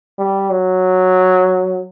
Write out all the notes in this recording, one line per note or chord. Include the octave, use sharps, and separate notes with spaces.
G3
F#3